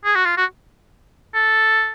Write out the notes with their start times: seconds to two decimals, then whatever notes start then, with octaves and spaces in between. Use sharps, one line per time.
0.05 G#4
0.15 F#4
0.25 F4
0.37 F#4
1.34 A4